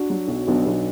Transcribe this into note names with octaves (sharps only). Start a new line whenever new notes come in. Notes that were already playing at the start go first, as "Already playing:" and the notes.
Already playing: D4 F#4
F#3
B1
B1 B3 D4
B1